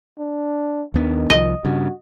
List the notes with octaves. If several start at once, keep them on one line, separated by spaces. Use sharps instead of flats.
D4
D#2 D#3 B3 D4
C2 F3 D#5
G2 C#3 F#4